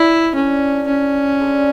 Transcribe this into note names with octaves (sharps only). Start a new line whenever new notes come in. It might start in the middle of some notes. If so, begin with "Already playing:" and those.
Already playing: D4 E4 F#4
C#4 D4 A4 D5
C#4
G#3 D4 A4 E5